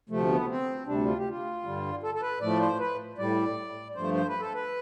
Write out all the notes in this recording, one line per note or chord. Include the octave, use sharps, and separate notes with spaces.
D2 C3 F3 A3
B3
C4
D2 C3 G3 D4
F4
G4
F4
G2 D3 G3
A4
A4
B4
A2 F3 A3 D5
C5
B4
A2 G3 D5
G2 F3 A3 C5
C5
B4
A4
B4